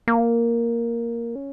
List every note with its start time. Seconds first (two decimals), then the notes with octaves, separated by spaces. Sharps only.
0.08 A#3
1.35 C#4